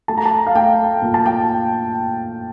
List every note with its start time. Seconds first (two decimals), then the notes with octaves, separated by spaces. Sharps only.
0.08 A3 A5
0.17 A#5
0.25 A5
0.47 F5
0.55 A3 G5
1.02 A#2
1.14 A5
1.26 G5